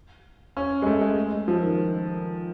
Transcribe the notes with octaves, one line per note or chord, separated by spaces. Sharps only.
C#4
G#3
A3
G#3
F3
D#3